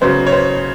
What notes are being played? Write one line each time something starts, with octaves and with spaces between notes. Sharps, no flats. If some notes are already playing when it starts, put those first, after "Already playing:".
C#3 F#3 B3 C5
C#5
C5